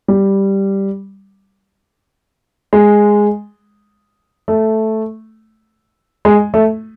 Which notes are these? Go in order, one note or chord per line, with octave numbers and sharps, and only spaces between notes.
G3
G#3
A3
G#3
A3